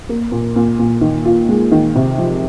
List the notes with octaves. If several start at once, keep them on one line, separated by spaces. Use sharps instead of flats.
A#3
A#2
A#2
A#2
D#3
F4
G#3
D#3
C3
F3